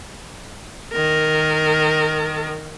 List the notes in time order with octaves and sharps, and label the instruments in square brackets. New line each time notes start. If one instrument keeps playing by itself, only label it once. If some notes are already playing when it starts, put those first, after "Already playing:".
[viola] D#3 A#4